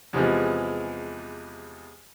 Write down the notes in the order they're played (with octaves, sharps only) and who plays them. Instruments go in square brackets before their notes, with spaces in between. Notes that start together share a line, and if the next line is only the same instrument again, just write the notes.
[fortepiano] E2 C3 E3 F3 G#3